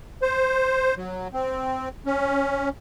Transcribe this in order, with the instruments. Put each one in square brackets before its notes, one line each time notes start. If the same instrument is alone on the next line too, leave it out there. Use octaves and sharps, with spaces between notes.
[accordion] C5
F#3
C4
C#4